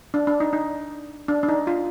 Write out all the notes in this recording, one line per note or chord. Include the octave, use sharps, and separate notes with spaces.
D4
D4
D#4
D#4
D4
D4
D#4
F4